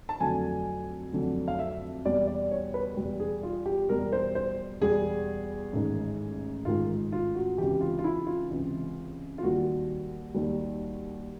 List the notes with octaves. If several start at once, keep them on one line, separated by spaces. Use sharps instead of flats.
A5
F2 D3 F#3 A3 G#5
F2 D3 F#3 A3
F5
E5
E2 B2 G3 D5
D5
C#5
B4
E2 B2 G3
G#4
F4
G4
E2 B2 G3 A#4
C5
C5
E2 B2 G3 G#4
A1 G#2 D#3 G#3
A1 G#2 D#3 G#3 F4
F4
F#4
C#2 C3 E3 G4
F4
F4
E4
F4
C#2 C3 E3
F4
D#2 D#3 G3 F#4
D#2 D#3 G3